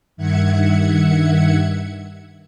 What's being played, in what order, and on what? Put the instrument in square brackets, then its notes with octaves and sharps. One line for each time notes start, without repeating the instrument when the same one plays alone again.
[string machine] G2 D#3 E5 F#5 G#6 C#7